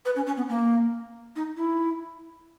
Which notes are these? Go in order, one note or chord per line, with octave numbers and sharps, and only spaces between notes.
B4
C#4
C#4
B3
A#3
D#4
E4